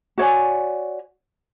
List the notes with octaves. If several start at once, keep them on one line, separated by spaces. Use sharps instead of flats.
F#4 C#5 D5 G#5